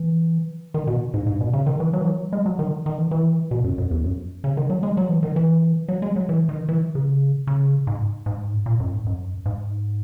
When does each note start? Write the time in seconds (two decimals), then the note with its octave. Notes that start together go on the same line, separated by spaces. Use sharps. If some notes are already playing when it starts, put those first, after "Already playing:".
Already playing: E3
0.74 D#3
0.87 B2
1.14 G#2
1.27 G#2
1.41 B2
1.53 C#3
1.66 D#3
1.80 E3
1.93 F#3
2.01 E3
2.08 F#3
2.33 G#3
2.46 F#3
2.59 D#3
2.86 D#3
2.98 E3
3.11 E3
3.51 B2
3.64 F#2
3.78 F#2
3.91 E2
4.04 F#2
4.44 C#3
4.57 D#3
4.70 F#3
4.83 G#3
4.97 F#3
5.09 E3
5.23 D#3
5.36 E3
5.88 F#3
6.02 G#3
6.16 F#3
6.29 E3
6.49 D#3
6.69 E3
6.95 C#3
7.47 C#3
7.87 G#2
8.26 G#2
8.66 A#2
8.80 F#2
8.92 G#2
9.06 F#2
9.46 G#2